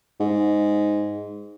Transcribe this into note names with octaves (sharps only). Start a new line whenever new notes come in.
G#2